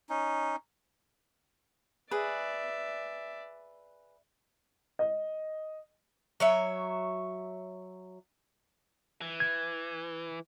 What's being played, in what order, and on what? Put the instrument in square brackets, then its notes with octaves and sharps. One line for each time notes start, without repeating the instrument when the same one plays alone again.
[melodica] C#4 D#4
[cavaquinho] G#4 B4 [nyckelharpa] D5 E5
[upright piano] D#5
[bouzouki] F#3 C#5 E5
[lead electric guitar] E3
[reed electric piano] G#6